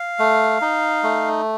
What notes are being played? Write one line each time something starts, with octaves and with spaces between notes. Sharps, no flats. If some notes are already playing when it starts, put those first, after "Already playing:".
Already playing: F5
A3
D#4
A3